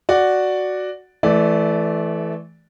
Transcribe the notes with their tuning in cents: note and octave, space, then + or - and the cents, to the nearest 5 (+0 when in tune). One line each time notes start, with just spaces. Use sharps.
F#4 +0 D5 +0
E3 +0 A3 -25 D5 +0